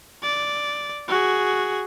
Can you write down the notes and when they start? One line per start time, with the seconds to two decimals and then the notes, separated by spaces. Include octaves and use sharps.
0.23 D5
1.08 F#4 G#4